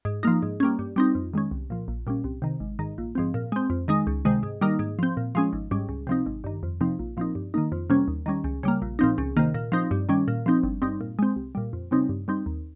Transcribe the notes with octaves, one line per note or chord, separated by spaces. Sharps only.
G#2
F3 A#3 D#4
G#2
G3 A#3 C#4
G2
G3 C4 D#4
F2
D#3 G#3 C#4
C2
A#2 F3
A#1
A#2 G3 C#4
C2
C3 D#3
G#1
G#2 D#3
A#1
G#2 F3 C4
A#2
G#3 C4
F2
D#3 G#3 D#4
C#2
C3 D#3 G#3
G#2
D#3 G3 A#3 D#4
G#2
F3 C4
A#2
F3 G#3 C#4
G#1
G#2 G3 C#4
C#2
C3 F3 C4 D#4
G#1
G2 D#3
F2
C3 F3 C4 D#4
A#1
A#2 F3 C4 D#4
G2
D#3 A#3 D#4
F2
C3 G3 A#3 C#4
D#2
D#3 G3 C#4
C#2
C#3 G3 A#3
A#1
A#2 F3 C4 D#4
C#2
C3 D#3 A#3
A#2
F3 C4 D#4
G2
D#3 G3 C#4
A#2
F3 C4 D#4
G1
G2 G3 C4 D#4
A#2
G#3 C4
C2
A#2 G3
F2
C#3 G3 C4 D#4
G2
G3 C4 D#4
D#2